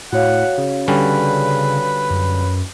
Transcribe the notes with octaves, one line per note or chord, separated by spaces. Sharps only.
A2 F#4 C#5 F5 F#5
C#3
D3 G3 C#4 B4
F#2